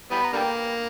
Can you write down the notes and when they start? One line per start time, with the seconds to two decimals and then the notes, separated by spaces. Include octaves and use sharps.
0.11 E3 G3 B3 B5
0.25 A#5
0.33 D3 G3 A#3 G5